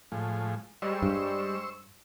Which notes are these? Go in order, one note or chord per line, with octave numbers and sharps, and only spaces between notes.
A2 F3 G#3
G3 G#3 C5 C#6 E6
G2